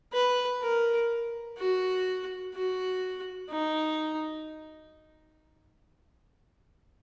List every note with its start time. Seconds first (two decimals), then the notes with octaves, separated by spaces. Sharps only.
0.13 B4
0.62 A#4
1.58 F#4
2.54 F#4
3.50 D#4